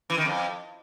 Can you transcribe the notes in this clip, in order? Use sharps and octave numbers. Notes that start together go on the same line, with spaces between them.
E3
D#3
F2